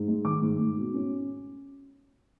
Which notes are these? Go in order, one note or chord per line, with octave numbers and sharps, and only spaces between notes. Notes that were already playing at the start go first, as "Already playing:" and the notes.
Already playing: G#2
G#3
D#3 D6
G#2
G#2
B2
C#4